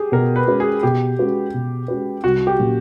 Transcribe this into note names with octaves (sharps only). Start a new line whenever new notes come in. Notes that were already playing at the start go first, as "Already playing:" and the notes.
Already playing: G4 G#4
B2 A#4
B4
G#3 C#4 F#4 B4
G#4
B2 G4
G#3 C#4 F#4 B4
B2
G#3 C#4 F#4 B4
C2 F#4
G4
A#2 F#3 A#3 C#4